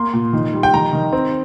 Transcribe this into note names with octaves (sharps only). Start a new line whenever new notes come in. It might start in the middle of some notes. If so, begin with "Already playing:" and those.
Already playing: A#3 C6
A#2
D#3
G3
G5
D#3 A#5
D#3
C4